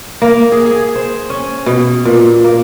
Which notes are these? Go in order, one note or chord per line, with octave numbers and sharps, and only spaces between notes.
A#3
G#4
G#4
C5
C#4
B2
A#2
A#3